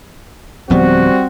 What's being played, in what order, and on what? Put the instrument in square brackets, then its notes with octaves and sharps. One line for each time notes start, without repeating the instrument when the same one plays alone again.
[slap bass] D1 F3 B3 [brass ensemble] G3 C4 F#4